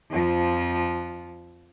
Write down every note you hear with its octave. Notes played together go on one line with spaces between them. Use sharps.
F2 F3